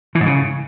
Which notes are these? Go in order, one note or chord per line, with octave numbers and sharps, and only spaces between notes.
E3
G#2
C#3